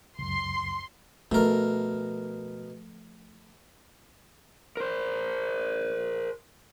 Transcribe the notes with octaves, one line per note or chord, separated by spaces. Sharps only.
C#2 F#2 C6
B2 F3 A3 A#4
A#4 C5